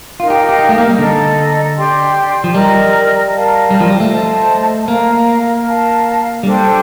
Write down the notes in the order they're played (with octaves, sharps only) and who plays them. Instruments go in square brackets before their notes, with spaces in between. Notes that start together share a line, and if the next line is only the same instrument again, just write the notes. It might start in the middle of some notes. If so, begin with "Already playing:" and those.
[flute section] D#4 A#4 F5 [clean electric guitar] F4
[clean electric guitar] G4
G4
G4
A3
A#3
G3
[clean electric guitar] D3 [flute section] A4 D#5 A#5
[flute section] G4 D5 G5 C6
[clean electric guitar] F3
[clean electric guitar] G3 [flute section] A#4 D#5 A#5
[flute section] A#4 F5 A5
[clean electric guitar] G3
F3
G3
A3
[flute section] C5 D#5 A5
[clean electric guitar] A#3 [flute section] A#4 F5 A#5
[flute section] A#4 F5 A5
[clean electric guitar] G3 [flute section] D4 A4 C5 G5